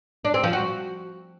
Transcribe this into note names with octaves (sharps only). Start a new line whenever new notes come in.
D4
C4
F3
F#4